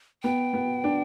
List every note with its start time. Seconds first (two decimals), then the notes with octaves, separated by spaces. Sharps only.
0.23 B3 G5
0.53 B3
0.84 D4